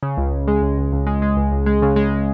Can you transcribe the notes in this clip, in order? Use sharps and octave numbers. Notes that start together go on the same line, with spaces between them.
C#3
C#2
C#2
G#3
C#2
C#2
C#2
G#3
G#3
C#2
C#2
G#3
C#3
G#3